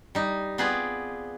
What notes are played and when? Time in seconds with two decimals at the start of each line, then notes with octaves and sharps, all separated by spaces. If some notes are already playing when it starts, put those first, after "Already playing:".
0.15 G3 D#4
0.58 B3 C4 F4 G#4 B4 D5